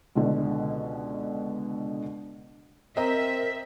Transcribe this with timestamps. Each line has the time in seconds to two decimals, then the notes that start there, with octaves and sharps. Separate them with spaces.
0.15 C#2 B2 D3
2.97 C4 A#4 D#5 E5 A#5